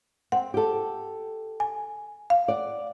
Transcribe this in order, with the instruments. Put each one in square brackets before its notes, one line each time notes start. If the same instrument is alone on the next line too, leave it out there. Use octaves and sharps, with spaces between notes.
[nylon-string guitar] C4 [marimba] F#5
[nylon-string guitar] G4 A4
[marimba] G#5
F5
[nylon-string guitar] D5 F#5